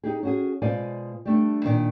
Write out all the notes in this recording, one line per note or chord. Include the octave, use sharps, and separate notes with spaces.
D#4 G4 G#4
C#4 F#4 G#4
B2 G#3 F4 C5 D5 G#5
G3 A3 D4
A#2 D#3 D4 F4